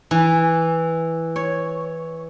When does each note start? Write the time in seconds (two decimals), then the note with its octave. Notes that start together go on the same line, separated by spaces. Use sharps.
0.11 E3
1.36 C#5